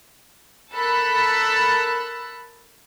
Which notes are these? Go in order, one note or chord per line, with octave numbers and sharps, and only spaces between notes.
A4 A#4 A5 B5 E6 F#6